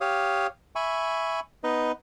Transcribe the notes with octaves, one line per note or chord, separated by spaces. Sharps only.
G4 C#5 F5 D#6
E5 G#5 B5 C#6
B3 D#4 B4 D#5